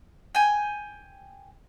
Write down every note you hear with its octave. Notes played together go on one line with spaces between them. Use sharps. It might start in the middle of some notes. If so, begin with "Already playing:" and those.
G5 G#5